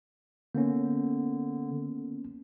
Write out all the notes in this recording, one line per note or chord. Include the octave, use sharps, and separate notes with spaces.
D3 A#3 B3 C#4